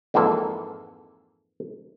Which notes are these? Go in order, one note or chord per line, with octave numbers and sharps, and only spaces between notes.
F2 G#2 E3 A#3 A4